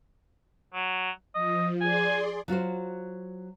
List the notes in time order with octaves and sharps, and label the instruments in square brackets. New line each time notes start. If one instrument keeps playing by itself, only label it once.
[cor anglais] F#3
[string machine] F3 [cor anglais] D#5
[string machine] G#4 D5 C6 [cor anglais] G#5
[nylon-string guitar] F#3 F4 F#4 C5